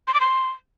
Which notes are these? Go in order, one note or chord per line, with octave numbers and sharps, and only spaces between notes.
C6
D6
C6